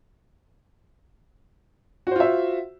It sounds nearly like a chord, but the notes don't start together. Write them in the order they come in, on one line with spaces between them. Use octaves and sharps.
F#4 C5 F4 E5